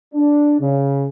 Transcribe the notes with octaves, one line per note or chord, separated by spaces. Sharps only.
D4
C#3